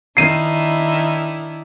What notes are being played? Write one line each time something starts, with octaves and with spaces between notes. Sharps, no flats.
D#3 D4 E4 C7 D#7